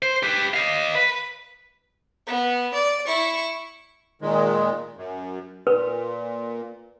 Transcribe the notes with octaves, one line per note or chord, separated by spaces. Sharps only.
C5
G4 B4
D#5 F5
B4
B3
D5
E4 C#6
A#2 D#3 G#3
F#2
A#2 B4